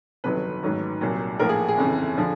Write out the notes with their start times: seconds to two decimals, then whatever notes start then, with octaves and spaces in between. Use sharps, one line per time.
0.24 G1 F2 C3 D#3 F#3 B4
0.63 A1 G#2 D#3 F#3
1.01 C2 A#2 F#3
1.39 A#1 A2 F3 A#4
1.49 G#4
1.68 G#4
1.78 G1 F2 C#3 E3
2.18 D3 F3